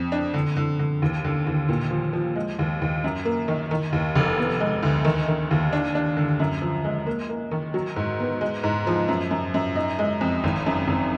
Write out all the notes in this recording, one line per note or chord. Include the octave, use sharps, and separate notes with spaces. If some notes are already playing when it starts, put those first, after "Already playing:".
Already playing: F2
D4
D3
D3
D3
D#2
D3
D#2
A#2
F3
F3
G#3
D#2
D#2
F#2
A#3
D#3
D#3
D#2
F1
B3
G#3
D2
D#3
D#3
D#2
D4
D4
D3
F#2
F3
G#3
A#3
A#3
D#3
F#3
G#2
B3
G#3
G#2
F3
F#2
F#2
F#2
D#4
G#3
F2
G#1
F#2
G#1